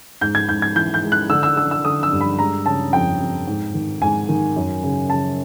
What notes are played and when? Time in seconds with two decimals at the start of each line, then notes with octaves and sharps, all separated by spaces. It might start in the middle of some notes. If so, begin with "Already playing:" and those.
0.21 G#2 G6
0.35 G#6
0.49 G#2 G6
0.62 G#6
0.76 E3 G6
0.94 G6
1.03 G#3
1.12 F#6
1.30 D3 E6
1.43 E6
1.56 D3 E6
1.71 E6
1.84 D3 D#6
2.03 E6
2.12 G2
2.21 B5
2.39 G#3 A#5
2.66 C#3 A5
2.93 F2 G5
3.20 F2
3.47 G#2
3.74 D#3
4.02 G#2 G#5
4.29 D#3
4.56 F#2
4.83 C#3
5.10 C#3 A5